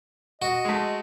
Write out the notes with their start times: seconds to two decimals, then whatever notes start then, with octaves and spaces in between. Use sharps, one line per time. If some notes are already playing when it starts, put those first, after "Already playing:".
0.42 F#4 D#5
0.65 G#3 A3